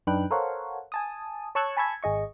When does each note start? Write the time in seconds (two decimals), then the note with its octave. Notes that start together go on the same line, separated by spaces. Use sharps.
0.07 F#2 D4 D#4 B4 G5 F#6
0.31 A4 A#4 C5 C#5 F5 F#5
0.92 G#5 A5 D#6
1.55 C#5 A5 C#6 E6 F#6 G#6
1.77 G#5 A5 B5 C#6 E6 G#6
2.03 G#1 G#4 D#5 C#6